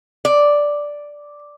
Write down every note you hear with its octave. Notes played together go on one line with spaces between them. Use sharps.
D5